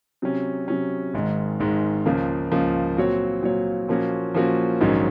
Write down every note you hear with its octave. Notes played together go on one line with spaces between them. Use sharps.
C3 F#3 C#4
C3 F#3 C#4
G#1 G#2 D#3 G#3
G#1 G#2 D#3 G#3
C#2 C#3 F3 A#3
C#2 C#3 F3 A#3
A#2 F#3 C4 F#4 C#5
A#2 F#3 C4 F#4 C#5
A#2 F3 A#3 C#4 F#4
A#2 F3 A#3 C#4 F#4
A#1 G#2 D#3 F#3 C#4